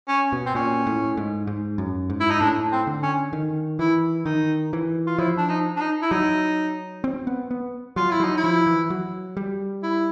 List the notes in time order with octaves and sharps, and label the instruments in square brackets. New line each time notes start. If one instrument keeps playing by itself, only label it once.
[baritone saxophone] C#4
[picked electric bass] B2
[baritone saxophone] C4
[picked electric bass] A#2 [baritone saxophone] C#4
[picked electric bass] A2
G#2
G#2
F#2
G#2
[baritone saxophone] E4
D#4
[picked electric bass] A2 [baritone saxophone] D4
[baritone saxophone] C4
[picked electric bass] D3
[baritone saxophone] C#4
[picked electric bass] D#3
[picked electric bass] E3 [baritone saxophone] E4
[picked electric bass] D#3 [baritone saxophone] D#4
[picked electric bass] E3
[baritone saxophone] F4
[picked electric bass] F3 [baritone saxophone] E4
[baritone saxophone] D4
D#4
D4
D#4
E4
[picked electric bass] F#3 [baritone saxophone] D#4
[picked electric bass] C4
B3
B3
[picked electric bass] F#3 [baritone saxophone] F4
[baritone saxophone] E4
[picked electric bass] F#3 [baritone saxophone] D#4
[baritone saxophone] E4
[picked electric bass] F3
E3
F#3
G3
[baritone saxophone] E4